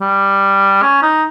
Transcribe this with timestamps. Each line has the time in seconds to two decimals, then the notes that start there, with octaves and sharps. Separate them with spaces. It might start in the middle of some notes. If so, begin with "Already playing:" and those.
0.01 G3
0.82 C#4
1.02 D#4